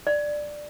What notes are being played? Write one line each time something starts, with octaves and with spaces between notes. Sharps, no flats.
D5